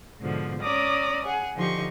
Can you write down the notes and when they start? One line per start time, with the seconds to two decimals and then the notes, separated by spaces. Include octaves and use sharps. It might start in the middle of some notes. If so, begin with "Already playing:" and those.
0.20 G#2 B2 D3 F3
0.62 C#4 D5 A#5 D6 D#6
1.25 G#4 F#5
1.56 D3 F3 D#4 G4 C6 C#6